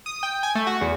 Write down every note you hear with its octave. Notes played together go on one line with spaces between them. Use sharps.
D#6
G5
G#5
A3
F#4
E2